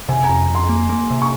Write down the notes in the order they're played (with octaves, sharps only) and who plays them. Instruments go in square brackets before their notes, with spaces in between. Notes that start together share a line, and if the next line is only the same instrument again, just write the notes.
[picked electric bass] C3 [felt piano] G#5
[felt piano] A#5
[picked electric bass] F2
F2
[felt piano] C6
[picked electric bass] A#3
A#3
C3
[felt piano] C#6